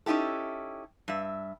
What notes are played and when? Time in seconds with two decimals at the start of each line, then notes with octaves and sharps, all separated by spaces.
0.06 C#4 D#4 E4 G4 A4
1.08 G2 E5